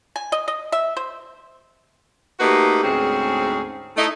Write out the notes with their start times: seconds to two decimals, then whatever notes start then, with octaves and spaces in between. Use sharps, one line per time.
0.16 G#5
0.32 D#5
0.48 D#5
0.72 E5
0.97 C5
2.40 A3 A#3 D#4 F#4 G4 B4
2.84 D2 G#2 C4 C#4 G#4
3.97 A3 D#4 E4